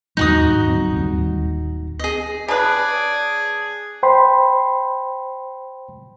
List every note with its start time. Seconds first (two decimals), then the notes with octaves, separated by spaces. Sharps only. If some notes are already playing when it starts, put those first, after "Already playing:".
0.17 D#2 A2 G3 D#4 F#4 D#6
0.42 G#2
0.68 D1 F#3 C4
0.94 D1 D#2 G3
1.99 G#4 D#5
2.48 C#3 G#4 B4 D5 A5 D#6 F#6
4.03 C5 G5 B5 C6